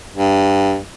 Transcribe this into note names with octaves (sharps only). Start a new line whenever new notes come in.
G2